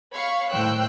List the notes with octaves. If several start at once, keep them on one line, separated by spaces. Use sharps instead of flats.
C#5 F5 B5 C#6
A2 D#3 C5 G5 E6 F#6